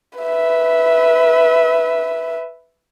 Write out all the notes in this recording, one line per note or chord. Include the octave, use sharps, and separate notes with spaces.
B4 E5